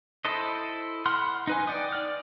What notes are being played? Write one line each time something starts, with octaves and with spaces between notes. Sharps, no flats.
E4 A4 C5 D#5
F#5 B5 C6 F6
D#4 B4 G#5
D5 F#5 G5 D#6
D5 F6